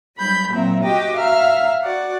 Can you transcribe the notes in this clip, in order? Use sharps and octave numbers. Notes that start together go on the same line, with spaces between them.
F#3 G3 B5 G6
A#2 F#3 C4 E5 A#5
F#4 G4 D#5 G5 D6
E5 F5 A#5 F6
F#4 D5 F#5